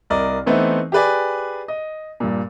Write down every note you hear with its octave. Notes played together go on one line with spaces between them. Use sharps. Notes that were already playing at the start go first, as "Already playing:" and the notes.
C2 A#4 D5 D#5
E3 A3 B3 C4 D#4
G4 G#4 B4 D5 G#5
D#5
G2 A#2